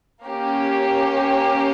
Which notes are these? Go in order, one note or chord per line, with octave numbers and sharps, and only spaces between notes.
A#3 C#4 G4